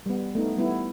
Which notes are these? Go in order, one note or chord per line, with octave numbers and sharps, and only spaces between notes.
G3 B3
A3 B3 D#4
G3 B3 E4